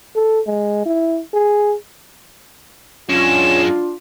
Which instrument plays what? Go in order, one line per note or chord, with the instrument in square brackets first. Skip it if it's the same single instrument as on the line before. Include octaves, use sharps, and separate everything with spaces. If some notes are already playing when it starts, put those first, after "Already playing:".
[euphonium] A4
G#3
E4
G#4
[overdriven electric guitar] F#2 G#3 [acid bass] C#4 [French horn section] D4 F4 [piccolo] E7